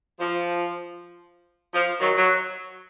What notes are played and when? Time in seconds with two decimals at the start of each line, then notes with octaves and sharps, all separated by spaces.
0.19 F3
1.74 F3
2.01 D#3 F#3
2.17 F#3